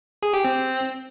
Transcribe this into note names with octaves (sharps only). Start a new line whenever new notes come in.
G#4
G4
C4